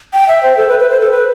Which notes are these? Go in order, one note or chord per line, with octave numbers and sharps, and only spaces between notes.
G5
E5
C5
A4
B4
B4
C5
A4
B4